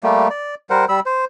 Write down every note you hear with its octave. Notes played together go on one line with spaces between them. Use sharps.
G3 A3 A#3 G4
D5
G3 A#4 C5 F#5
G3 B5 E6
C5